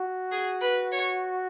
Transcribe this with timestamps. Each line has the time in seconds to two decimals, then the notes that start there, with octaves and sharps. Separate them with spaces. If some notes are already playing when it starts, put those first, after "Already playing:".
Already playing: F#4
0.31 G#4
0.61 B4
0.92 C#5